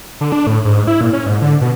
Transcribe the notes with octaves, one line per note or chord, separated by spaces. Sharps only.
D3
D4
A2
G#2
E4
A#2
C#4
G#2
D3
B2